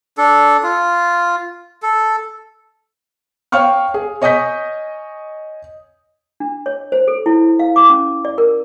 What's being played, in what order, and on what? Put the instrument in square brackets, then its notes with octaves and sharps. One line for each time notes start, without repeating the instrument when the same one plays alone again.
[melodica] D4 A4
F4
A4
[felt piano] C#5 F5 G5 C#6 F6
G#4
C#5 D#5 G#5 D#6 G6 B6
[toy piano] D4
C#5
C5
A4
E4
F5
D6
C#4
D5
A#4